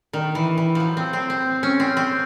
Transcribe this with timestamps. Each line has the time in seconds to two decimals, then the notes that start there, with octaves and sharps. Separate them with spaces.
0.13 D#3
0.35 E3
0.58 E3
0.75 F3 F#3
0.97 C4
1.13 C4
1.30 C4
1.63 C#4
1.80 C4
1.97 C4